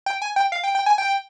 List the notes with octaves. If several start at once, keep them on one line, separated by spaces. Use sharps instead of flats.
G5
G#5
G5
F5
G5
G5
G#5
G5